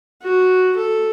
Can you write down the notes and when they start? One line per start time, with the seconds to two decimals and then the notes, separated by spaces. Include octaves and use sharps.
0.22 F#4
0.76 A4